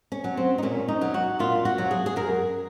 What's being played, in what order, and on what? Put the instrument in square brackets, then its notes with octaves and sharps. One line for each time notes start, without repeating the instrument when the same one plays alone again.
[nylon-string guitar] C#4
F#3
C4
D#4
A#2 C#4
D#4
F#3
F#4
A#2 F4
F#4
F#3
G#4
G#4
F#2 A#4